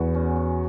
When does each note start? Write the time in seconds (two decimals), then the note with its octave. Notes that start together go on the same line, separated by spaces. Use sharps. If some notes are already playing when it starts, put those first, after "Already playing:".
Already playing: E2 B3 F#4
0.14 C#4
0.36 F#4